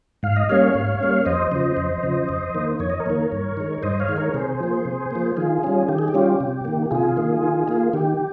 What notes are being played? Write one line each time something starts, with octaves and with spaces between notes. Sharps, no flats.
G#2 F5
D#5
G3 A#3 C#4 C#5 F5
G#2
G3 A#3 C#4
F2 C5 D#5
C#3 F3 C5 D#5
F2
C#3 F3
F2
D#3 A#3
F2 C#5
D#5
A#4 C#5
D#3 A#3
G2
D#3 G#3
G2 C5 D#5
C#5 F5
D#3 G#3
A#4 C#5
C3 G#4 C5
F3 A#3
C3
F3 A#3
D#3 F4 G#4
G3 C#4 F4
D#3 G4
G#4
G4
G3 C#4 F4
C3
D#3 A#3
C3 F4 G#4
D#3 A#3
D#3
A#3 F4
D#3 G4